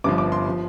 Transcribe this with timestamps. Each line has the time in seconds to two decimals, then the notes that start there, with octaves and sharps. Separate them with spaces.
0.04 G1 G2 F3 D6
0.18 D6
0.32 C6
0.49 F3